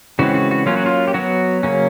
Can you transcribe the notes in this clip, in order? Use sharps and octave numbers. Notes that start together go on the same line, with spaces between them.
C#3 E3 G#3 C4 F#4
F#4
F#4
F#3 A#3 C#4 F4
F#4
F4
G4
F#3 B3 F#4
C#3 F#3 A#3 C#4